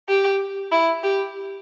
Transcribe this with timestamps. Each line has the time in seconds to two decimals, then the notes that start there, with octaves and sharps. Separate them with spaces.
0.09 G4
0.72 E4
1.03 G4